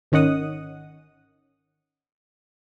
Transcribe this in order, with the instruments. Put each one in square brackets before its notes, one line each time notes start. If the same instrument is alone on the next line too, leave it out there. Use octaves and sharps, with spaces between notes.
[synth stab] G#1 D#3 C#4 D#5 F#5 D#6